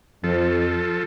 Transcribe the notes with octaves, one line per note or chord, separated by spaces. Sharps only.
F2 F3 A4